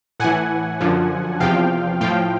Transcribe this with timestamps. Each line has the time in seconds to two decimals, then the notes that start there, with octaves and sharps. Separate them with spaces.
0.20 A2 E3 F#5 G#5
0.81 F#2 D3 F3
1.40 E2 C3 F3 F5 G5
2.01 A2 F3 F5 G5